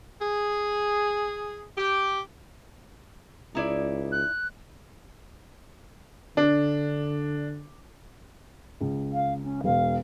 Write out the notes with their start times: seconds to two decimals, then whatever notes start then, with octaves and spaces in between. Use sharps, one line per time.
0.22 G#4
1.78 G4
3.55 C#2 D#4 E4 D5
4.11 F#6
6.37 D3 D4
8.81 C#2
9.13 F5
9.43 C#4
9.64 E1 F5